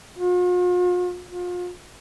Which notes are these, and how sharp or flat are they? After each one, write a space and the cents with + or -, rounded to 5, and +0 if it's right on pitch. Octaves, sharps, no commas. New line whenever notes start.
F4 +45
F4 +35